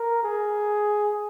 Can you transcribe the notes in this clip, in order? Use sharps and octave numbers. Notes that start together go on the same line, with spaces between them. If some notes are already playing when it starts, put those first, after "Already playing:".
Already playing: A#4
G#4